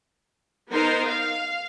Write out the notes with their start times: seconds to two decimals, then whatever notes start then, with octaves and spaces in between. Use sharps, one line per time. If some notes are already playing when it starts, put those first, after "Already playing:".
0.71 B3 D#4 A#4 C5
1.08 F5